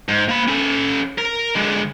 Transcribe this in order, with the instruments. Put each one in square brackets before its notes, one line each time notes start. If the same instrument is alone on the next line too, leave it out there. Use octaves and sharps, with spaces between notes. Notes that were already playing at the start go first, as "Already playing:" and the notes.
[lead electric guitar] G#2
A#3 B5
C#4 A4
A#4
D3 G#3